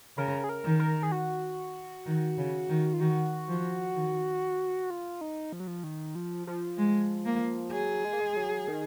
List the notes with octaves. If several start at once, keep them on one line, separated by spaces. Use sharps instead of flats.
C#3 A#4
G#4
A#4
D#3
A#4
G#4
F#4
D#3
C#3
D#3
F4
D#3 F#4
F3
D#3
F4
D#4
F3
F#3
F3
D#3
F3
F3
G#3
A#3
F#3 G#4
G#3
A#3
G#3
F#3
D#3